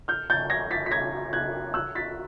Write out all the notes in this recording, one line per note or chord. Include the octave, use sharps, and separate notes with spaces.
F6 G6
G6 A6
G#6 A#6
A6 B6
B6
G#6 A#6
F#6 G#6
E6 F#6
A6 B6